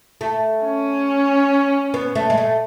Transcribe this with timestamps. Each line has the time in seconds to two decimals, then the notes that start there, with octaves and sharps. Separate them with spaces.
0.21 A3
0.64 C#4
1.94 B3
2.15 A3
2.30 G#3
2.38 A3